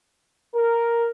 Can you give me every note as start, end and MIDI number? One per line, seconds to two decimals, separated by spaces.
0.55 1.10 70